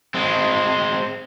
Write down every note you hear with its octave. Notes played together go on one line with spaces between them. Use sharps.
G#3 C4